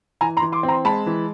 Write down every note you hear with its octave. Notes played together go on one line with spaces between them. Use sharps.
E3 G#5 A#5
A#5 C6
E3
C6 D6
C4
A#5 C6
G#3 A5 B5
E3